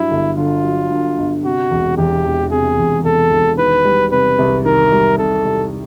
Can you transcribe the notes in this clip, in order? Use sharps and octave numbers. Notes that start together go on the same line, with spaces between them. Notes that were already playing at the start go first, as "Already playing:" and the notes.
Already playing: G2 F#3 E4
G1
D3 F4
F#3
G2
G1
C3 F#4
E1
E2 G4
E1
C3 G#4
E1
E2 A4
E1
D#3 B4
G3
C3 B4
C2
D#3 A#4
G3
C3 A4
C2